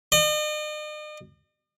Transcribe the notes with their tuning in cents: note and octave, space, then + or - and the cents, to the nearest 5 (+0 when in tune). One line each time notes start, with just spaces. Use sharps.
D#5 -45